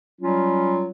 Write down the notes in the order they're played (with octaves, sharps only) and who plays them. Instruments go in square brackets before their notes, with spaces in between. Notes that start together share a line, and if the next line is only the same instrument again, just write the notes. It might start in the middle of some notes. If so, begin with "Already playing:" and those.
[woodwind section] F#3 G3 C#4 F4